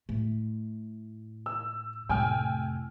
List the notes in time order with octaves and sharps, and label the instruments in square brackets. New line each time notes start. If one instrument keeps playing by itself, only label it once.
[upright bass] A2
[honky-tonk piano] E6
[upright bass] F1 A2 [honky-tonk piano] G5 G#5 F6